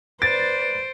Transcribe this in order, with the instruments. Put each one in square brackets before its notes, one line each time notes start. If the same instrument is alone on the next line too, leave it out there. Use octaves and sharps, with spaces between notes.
[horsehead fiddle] B4 D5 [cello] C5 [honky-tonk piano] A6 [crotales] D7